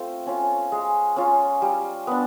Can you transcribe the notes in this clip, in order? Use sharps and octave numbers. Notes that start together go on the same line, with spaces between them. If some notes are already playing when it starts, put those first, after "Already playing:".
Already playing: A3 C4 F4
C#4 F4
G#3
C#4 F4
G3
B3 D4